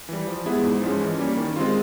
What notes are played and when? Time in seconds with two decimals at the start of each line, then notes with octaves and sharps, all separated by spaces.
0.09 E3 G3
0.27 F3
0.46 G#3 B3 E4 G#4
0.63 G#2
0.82 F3 G#3 C#4
1.01 E3
1.19 G3 A#3 C#4
1.37 D#3
1.56 G#3 C4 F4